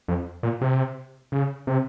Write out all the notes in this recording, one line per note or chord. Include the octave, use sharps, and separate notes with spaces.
F2
A#2
C3
C#3
C3